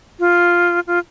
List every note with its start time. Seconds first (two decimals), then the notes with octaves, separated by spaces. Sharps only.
0.19 F4
0.87 F4